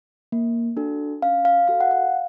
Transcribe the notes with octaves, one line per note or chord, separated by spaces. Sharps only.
A#3
D4 F#4 A4
C#4 F5
F5
F#4 A4 F5
F#5
F5